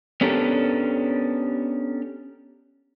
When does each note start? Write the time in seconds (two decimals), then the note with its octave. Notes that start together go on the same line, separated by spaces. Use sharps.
0.21 B3 C#4 D4 G4 A4 A#4